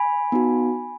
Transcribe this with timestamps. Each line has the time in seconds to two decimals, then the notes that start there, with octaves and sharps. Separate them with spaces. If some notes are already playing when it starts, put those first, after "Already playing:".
Already playing: G#5 B5
0.32 B3 D#4 F#4